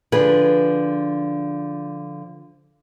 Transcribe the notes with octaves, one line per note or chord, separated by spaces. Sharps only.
D3 F3 G#4 B4